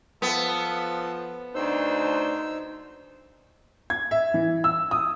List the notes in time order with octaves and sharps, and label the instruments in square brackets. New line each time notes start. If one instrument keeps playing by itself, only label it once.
[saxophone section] F3 [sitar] B3 [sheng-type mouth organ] A4 A5
[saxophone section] D2 C5 [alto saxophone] D4 [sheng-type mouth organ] D#4 E6
[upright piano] G#6
E5
E3
E6
D#6